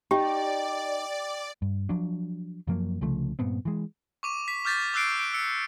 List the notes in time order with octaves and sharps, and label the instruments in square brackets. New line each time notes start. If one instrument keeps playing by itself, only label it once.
[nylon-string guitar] D#4 [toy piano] G4 [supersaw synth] D5 [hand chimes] G5
[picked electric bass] G2
F3 F#3 D4
F#2 F3 F#3 A#3
C2 C#3 F3 A3
G2 A#2 B3 C4
E3 G#3
[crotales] C#6 D6 D#7
B6
D6 F6 G6 A6 B6
D6 E6 F#6 C7 D7
D7
E6 C#7